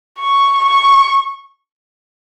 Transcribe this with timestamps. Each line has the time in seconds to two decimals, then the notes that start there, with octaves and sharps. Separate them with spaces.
0.19 C#6
0.63 C#6